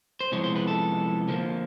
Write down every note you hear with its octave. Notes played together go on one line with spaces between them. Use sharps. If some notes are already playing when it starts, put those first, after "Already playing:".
C5
C3 F3 G#3 B3 E4 C#5
C5
B4
A4
D3 F3 A#3